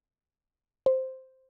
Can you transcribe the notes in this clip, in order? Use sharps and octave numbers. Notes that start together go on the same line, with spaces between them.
C5